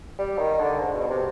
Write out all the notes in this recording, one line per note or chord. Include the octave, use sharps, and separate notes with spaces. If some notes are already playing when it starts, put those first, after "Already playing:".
G3
D#3
D3
G#2
B2
C3